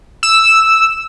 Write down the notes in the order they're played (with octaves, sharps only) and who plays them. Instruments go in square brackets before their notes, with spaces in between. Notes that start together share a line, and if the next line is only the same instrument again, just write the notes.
[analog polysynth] E6